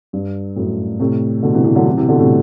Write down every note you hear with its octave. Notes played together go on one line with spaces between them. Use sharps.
G2
F#2 A2
A2 C3
B2 D3
C3 E3
C3 E3
D3 F#3
C3 E3
C3 E3
B2 D3
A2 C3